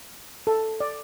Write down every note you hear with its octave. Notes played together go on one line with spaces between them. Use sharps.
A4
D5